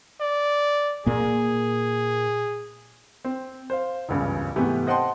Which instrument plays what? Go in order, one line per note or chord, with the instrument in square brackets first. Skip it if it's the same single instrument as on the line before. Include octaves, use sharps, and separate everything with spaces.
[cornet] D5
[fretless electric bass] A#2 A#3 [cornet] G#4
[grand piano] C4
C5 F5
E1 C#2 G2 C#3
G#2 C3 E3 A3 B3 G4
C5 D#5 F#5 G5 A5 C6